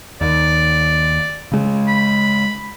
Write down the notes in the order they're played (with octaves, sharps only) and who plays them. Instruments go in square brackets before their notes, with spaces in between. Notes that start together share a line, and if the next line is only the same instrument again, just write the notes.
[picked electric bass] D#2 [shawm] D5
[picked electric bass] C#3 G#3
[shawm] B5